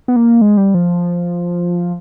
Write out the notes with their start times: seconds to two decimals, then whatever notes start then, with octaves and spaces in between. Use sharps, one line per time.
0.08 B3
0.16 A#3
0.41 G#3
0.57 G3
0.74 F3